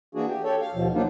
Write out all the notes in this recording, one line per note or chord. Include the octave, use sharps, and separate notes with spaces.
E3 A#3 D4 F#4 G#4
G4
G4 A4 C#5
F5
D#2 B2 F3
F3 F#3 A#3 D4 D#4 F4